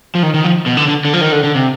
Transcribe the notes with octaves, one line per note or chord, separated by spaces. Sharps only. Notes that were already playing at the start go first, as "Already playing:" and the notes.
F3
D#3
D#3
F3
B2
D3
D3
D3
F3
D#3
D3
D3
C3